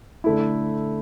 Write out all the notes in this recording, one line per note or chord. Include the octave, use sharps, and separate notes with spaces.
D3 A3 E4